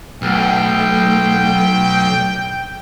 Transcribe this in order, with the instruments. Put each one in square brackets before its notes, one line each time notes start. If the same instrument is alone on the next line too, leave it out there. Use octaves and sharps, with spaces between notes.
[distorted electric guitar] B1 [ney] A3 [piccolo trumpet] G5